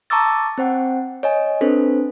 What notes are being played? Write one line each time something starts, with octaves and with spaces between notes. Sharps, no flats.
A5 A#5 C#6 D6 E6 A6
C4 C5 F#5 G5
C#5 D#5 G#5
C4 D4 A4 B4 C5